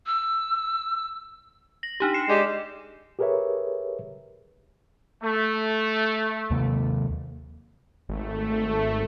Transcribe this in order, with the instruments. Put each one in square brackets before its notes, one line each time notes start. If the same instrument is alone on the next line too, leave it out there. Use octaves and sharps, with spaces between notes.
[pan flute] E6
[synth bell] A#6 F#7
D4 D#4 G4
C7 C#7 E7
[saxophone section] G#3 G4 [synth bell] D5 E7
[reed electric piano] G4 G#4 A#4 B4 C#5 E5
[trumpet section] A3
[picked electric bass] D#2 C3 A#3
[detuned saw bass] G#1 [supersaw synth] A3